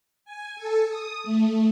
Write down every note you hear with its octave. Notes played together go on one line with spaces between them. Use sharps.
G#5
A4
D#6
A3